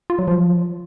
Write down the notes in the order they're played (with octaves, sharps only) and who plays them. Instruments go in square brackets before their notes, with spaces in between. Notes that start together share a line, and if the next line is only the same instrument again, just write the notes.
[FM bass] F4
F#3
F3